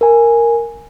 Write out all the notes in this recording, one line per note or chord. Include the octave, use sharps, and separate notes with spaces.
A#4 G#5